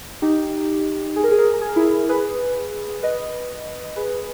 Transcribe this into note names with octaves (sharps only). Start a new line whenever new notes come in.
D#4 G4
G#4
A#4
G#4
A#4
G#4
A#4
G#4
A#4
E4 G#4
G#4 B4
B4 D#5
G#4 B4